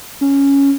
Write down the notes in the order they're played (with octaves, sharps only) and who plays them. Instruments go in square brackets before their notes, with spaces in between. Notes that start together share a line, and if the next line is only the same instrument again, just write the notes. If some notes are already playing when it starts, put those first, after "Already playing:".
[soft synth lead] C#4